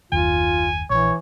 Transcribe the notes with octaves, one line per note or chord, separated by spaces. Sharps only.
F#1 D#2 D#3 F4 G#5
A#1 E3 C#5